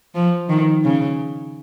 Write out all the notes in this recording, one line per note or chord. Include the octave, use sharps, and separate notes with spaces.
F3
D#3
C#3